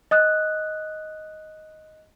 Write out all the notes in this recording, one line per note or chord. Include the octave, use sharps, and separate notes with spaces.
D#5 D#6 F#6